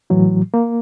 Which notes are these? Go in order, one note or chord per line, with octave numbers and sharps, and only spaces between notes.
A2 E3 F#3
A#3